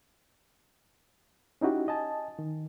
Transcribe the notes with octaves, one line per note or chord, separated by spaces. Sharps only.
C#4 D#4 E4 F#4 G4
D#5 G#5 A5
D#3